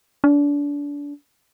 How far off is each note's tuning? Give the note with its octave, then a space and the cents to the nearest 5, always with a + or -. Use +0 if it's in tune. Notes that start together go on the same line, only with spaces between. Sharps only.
D4 -30